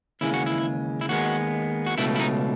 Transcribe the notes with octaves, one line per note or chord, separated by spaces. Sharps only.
D#2 C#3 E3 G#3 E4
F#4
E4
E4
D#2 D#3 G#3 B3 F#4
F#4
C#2 B2 A3 E4
E4
D#4